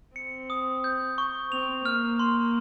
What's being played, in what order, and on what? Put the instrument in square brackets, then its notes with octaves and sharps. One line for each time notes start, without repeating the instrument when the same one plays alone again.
[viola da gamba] C4 [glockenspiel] C#7
[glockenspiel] D#6
G6
C#6
[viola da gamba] C4 [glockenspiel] F7
[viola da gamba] A#3 [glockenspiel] F6
[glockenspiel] C6